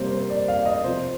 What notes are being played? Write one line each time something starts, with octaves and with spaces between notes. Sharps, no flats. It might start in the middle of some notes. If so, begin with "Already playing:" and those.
Already playing: C3 G3 A#3 C5
C5
D5
F5
D#5
C3 F3 C4 C5